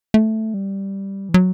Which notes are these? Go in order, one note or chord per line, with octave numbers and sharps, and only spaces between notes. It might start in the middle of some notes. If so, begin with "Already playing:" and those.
A3
G3
E3
F#3